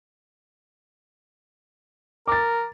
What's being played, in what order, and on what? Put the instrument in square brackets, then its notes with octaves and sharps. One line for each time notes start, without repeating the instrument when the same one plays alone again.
[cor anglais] A#4 [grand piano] D6 A6